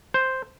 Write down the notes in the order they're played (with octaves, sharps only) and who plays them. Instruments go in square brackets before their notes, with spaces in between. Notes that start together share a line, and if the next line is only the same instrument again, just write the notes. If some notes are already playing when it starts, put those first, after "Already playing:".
[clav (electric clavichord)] C5